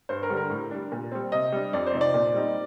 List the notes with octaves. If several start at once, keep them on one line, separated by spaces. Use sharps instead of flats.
G2 C5
A#4
D3 G3
A#4
A2
G3 D4
A#2
G3 C4
C3 D#5
G3 D4
F2 D5
C5
C3 F3 C4 D#4
D5
A#2
G3 C4 D#4